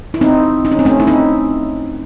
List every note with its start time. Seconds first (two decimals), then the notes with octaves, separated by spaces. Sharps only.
0.14 E4
0.21 C4 D#4
0.65 D#4
0.72 C#4
0.79 C4
0.85 A3 C#4
1.00 E4
1.07 C4 D#4